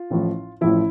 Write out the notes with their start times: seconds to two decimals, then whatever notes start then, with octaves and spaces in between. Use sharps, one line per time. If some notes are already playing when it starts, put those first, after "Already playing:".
Already playing: F4
0.10 A1 A2 F3
0.61 A1 A2 F3 E4